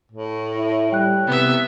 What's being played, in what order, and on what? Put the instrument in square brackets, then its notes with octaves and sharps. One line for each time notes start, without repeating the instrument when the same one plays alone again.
[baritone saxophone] A2
[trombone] E4
[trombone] G3 [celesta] G5 F#6
[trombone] C3 [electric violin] B3 E5